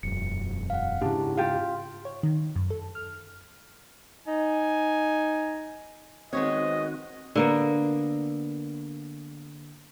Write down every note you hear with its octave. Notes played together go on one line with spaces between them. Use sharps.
E1 F#2 C#7
F5 F#5
G#2 C#3 D4 E4 G4
F4 G4 F5
C#5
D#3
F#2
A4
F6
D#4 G#5
D#3 G#3 B3 C4 F#4 C#5 D#5
D3 A#3 B3